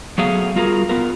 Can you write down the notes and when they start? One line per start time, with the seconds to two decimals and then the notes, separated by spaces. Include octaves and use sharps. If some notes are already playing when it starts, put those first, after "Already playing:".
0.18 F#3 A3 B3 G#4 F5
0.56 G3 F4 F#4 G#4 A#4
0.89 B3 F4 A#4